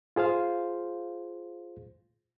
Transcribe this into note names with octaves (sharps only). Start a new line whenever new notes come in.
F4 G#4 C5 F5